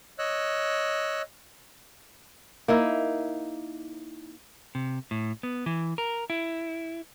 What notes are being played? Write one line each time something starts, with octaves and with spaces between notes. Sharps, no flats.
C#5 D#5 E6 F#6
A#3 D#4 E4
C3
A2
B3
E3
A#4
E4